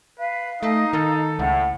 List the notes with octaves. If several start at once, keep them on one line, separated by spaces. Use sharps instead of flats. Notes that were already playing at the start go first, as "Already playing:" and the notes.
B4 F5
A3 D#4 D#5
D#3 A4
C#2 A2 F#5